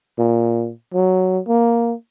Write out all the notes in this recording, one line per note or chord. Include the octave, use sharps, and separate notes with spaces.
A#2
F#3
A#3